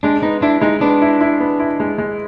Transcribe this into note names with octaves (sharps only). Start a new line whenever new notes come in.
G#3 D4
B3 D#4
D4 E4
G#3 D#4
B3 D4
E4
E4
B3
E4
G#3
G#3